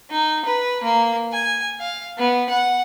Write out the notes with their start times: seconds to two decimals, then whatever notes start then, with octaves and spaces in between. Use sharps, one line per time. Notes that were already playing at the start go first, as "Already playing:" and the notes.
0.11 D#4
0.45 B4
0.83 A#3
1.33 G#5
1.80 F5
2.18 B3
2.50 F#5